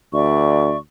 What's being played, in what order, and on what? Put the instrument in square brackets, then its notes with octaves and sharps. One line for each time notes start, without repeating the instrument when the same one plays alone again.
[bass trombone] D2 [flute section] D5 E5 C#6